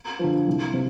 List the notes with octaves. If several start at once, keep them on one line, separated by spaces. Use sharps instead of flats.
D3 F3
C2
C3